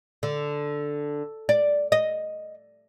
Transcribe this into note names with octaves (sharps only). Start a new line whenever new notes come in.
D3
D5
D#5